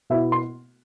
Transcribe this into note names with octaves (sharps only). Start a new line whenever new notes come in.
B2 B3 E4 E5
C6